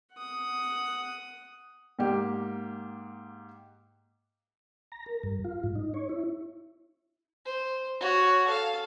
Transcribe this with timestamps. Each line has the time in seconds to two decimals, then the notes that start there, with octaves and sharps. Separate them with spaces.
0.14 F#5 D#6
1.99 G#2 A#3 G4
4.92 A#5
5.06 A#4
5.23 G2
5.44 F4
5.64 G#2
5.75 D#4
5.94 C#5
6.09 E4
7.46 C5
8.00 F#4 C#5
8.47 A4 F5